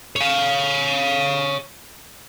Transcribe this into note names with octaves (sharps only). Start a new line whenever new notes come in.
C#5 F5